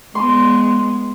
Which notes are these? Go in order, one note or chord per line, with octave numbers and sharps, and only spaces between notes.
G#3 B3 C6